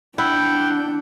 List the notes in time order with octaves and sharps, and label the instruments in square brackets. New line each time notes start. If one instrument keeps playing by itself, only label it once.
[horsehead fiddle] D4 [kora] E4 [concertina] F#5 G5